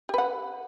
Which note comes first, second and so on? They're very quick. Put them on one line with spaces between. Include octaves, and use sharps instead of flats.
G4 B4 F#5